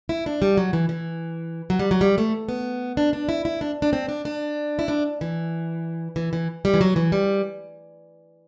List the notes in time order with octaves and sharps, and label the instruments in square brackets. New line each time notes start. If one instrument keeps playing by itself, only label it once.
[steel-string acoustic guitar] E4
D4
G3
F#3
E3
E3
F#3
G3
F#3
G3
A3
B3
D4
D4
E4
E4
D4
D4
C4
D4
D4
E4
D4
E3
E3
E3
G3
E3
F#3
E3
G3